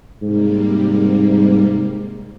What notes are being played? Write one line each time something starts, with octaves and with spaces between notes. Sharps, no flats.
G#2 C3 G3 A#3